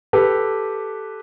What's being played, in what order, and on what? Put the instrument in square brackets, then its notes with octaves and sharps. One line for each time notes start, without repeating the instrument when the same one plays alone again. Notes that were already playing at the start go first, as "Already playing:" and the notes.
[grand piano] G4 A4 B4